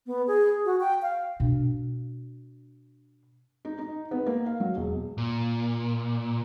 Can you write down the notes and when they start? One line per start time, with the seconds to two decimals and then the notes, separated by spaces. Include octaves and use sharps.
0.06 B3
0.27 G#4
0.65 F#4
0.80 G5
1.02 F5
1.40 B2 D4
3.65 D#4
3.78 D#4
4.11 B3
4.26 A#3
4.46 F5
4.60 F#3
4.77 E1
5.18 A#2